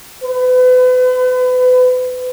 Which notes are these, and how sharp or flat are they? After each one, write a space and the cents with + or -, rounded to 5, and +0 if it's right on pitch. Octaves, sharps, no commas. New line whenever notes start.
B4 +35